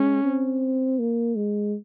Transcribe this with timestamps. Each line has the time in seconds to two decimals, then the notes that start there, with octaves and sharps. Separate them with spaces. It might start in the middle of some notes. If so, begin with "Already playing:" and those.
Already playing: G#3 C#4
0.24 C4
0.99 A#3
1.36 G#3